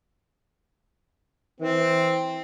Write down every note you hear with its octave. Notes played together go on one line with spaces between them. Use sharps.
E3 C4